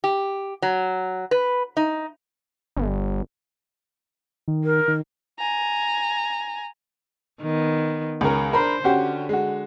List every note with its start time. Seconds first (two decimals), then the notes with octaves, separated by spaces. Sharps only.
0.04 G4
0.62 F#3
1.31 B4
1.77 D#4
2.77 G1
4.48 D#3
4.64 A#4
4.88 D#3
5.39 G#5 A#5
7.42 D#3 B3
8.21 C#2 C#4 A#4
8.53 D4 A#4 C5 B5
8.84 D3 C#4 F#4 G4
9.29 G#3 F#4